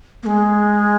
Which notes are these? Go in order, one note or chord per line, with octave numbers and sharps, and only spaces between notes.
A#3
G#3